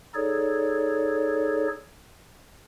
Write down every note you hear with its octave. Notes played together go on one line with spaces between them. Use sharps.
D#4 G#4 A4 C#5 D5